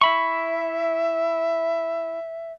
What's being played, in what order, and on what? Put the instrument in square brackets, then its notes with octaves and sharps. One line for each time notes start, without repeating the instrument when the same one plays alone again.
[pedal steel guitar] E4 B5 C#6 [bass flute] E5